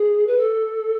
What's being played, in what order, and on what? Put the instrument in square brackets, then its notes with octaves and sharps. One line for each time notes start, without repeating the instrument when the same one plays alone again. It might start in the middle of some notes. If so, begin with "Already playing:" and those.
Already playing: [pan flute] G#4
B4
A4